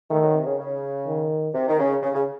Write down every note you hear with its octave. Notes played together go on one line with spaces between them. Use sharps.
D#3 A3
F#3
C3
C#3
C#3
D#3
C3
D#3
C#3
C#3
C#3